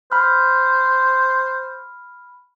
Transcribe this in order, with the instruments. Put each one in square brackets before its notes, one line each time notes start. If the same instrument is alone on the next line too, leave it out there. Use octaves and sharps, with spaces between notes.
[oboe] C5 [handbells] B5 F6